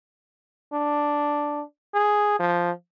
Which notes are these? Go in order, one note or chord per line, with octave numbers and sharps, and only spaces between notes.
D4
G#4
F3